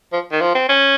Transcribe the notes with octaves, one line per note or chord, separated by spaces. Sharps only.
F3
D#3
F3
C4
C#4